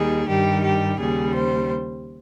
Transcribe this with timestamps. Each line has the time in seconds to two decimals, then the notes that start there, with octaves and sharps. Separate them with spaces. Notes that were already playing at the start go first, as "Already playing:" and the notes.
Already playing: D#2 D#3 G3 G#4
0.28 G2 D#3 G3 G4
0.64 G4
0.99 D#2 C#3 G3 G#4
1.34 C5